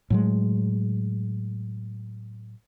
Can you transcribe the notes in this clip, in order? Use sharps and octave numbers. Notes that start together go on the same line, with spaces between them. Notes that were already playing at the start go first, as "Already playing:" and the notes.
A2 F#3 G#3